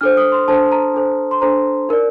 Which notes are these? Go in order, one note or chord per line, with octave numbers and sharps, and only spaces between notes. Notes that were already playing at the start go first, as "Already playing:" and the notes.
D4 A4 C5 F6
D#6
C6
D4 A4 C5 A5
A#5
D4 A4 C5
C6
D4 A4 C5 A#5
D#4 A#4 D5